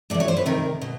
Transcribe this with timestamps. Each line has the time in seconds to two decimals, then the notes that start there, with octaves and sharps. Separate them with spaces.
0.10 A2 D5
0.14 E3
0.20 C#5
0.28 C5
0.37 B4
0.46 C3 D#3 A#4
0.81 B2